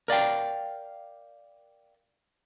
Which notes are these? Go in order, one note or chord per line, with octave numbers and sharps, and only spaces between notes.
A#4 D5 F5 G5